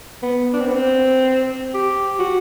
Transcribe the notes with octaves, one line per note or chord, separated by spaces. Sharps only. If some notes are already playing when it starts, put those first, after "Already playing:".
B3
D4
C4
B3
C4
G4
F#4